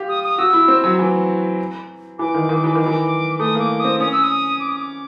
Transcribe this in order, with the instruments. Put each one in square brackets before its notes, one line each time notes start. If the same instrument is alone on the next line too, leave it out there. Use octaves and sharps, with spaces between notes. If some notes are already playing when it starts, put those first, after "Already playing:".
Already playing: [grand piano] F4 G4
[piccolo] D#6
D#6
[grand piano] F#4 [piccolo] E6
[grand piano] E4
C4
F#3
E3
[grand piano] E3 [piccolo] D6
[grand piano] D#3
D#3
E3
[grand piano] D#3 [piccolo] D6
[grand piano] E3
[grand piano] A3 [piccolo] D#6
[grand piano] A#3
[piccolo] D6
[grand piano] C4 [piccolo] D#6
[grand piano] C#4 [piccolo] D#6
[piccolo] E6
D#6
D6
D#6
D6